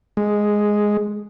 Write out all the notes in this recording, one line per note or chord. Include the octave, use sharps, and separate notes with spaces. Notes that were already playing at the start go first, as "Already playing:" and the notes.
G#3